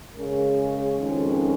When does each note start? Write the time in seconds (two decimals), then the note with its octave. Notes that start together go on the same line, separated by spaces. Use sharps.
0.15 C#3 G#3 C#4 A#4
0.56 G#4
0.97 F2 D#3 G#3 C#4